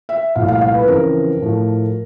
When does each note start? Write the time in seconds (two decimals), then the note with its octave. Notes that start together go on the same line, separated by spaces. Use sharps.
0.09 E5
0.35 C2 A#2 F3 A3 F5
0.48 F5
0.61 F5
0.74 B4
0.87 F2 C#3 E3 A#4
1.40 A2 F3 A3